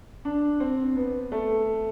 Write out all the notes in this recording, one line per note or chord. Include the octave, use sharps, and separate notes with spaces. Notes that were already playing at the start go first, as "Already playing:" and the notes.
D4
C4
B3
A3